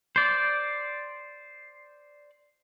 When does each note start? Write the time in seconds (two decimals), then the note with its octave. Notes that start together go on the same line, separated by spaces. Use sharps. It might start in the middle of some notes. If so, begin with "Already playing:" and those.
0.16 C5 D5